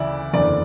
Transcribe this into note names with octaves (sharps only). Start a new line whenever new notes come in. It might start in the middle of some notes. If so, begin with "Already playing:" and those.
Already playing: D2 C#3 E3 E4 D5
F#1 E2 D3 D5